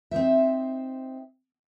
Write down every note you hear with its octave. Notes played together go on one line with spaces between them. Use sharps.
C4 D#4 C5 E5